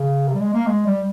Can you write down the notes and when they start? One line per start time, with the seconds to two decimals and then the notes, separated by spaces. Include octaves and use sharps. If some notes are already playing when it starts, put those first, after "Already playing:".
Already playing: C#3
0.28 C3
0.35 G3
0.41 G#3
0.54 A#3
0.67 G#3
0.86 G3